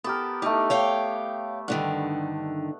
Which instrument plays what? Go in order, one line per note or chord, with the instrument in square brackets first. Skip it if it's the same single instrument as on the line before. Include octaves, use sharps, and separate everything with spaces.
[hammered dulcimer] B3 G4 A#4 [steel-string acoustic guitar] A4
[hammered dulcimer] A3 G4 [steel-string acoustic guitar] D#4
[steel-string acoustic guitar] C#5 F5 G5
[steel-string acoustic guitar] G2 D3 D#3 [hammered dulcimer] F#5